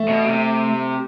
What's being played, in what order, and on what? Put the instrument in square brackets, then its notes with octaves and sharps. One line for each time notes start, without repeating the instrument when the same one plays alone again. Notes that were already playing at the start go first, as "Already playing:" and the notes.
Already playing: [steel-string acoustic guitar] A3
[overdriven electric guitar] B2
C3